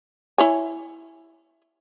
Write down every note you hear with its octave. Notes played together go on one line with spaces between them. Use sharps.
E4 C#5 G#5